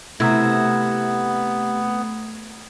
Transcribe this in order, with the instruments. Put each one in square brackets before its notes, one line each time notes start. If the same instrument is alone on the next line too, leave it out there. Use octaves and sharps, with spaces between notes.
[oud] C3 E4 [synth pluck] A3 [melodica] B3 [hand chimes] A#5 E6 G#6